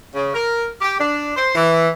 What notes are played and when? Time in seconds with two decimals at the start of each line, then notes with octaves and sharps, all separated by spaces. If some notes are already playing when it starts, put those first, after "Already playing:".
0.13 C#3
0.34 A#4
0.82 G4
1.00 D4
1.36 C5
1.55 E3